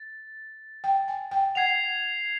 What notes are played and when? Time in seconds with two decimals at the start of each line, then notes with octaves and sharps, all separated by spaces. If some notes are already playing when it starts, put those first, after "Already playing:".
Already playing: A6
0.84 G5
1.08 G#5
1.31 G5
1.55 F#5 G#6 C7 F7